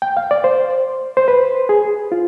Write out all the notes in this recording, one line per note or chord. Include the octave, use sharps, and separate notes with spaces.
G5
F5
D5
C5
C5
B4
G#4
F4